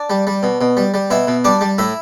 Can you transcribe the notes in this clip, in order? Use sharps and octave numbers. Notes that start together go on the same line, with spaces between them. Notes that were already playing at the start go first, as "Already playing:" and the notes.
Already playing: D4 D5
G3
G3
B2
B2
G3
G3
B2 E4 E5
B2
G3 D4 D5
G3
A2 E4 E5